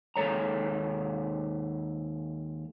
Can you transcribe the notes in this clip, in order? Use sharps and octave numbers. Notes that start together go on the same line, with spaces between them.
D#2 G#3 A4 C#5 A#5